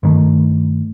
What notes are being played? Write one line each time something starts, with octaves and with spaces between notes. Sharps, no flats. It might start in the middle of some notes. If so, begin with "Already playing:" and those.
G2 D#3 A3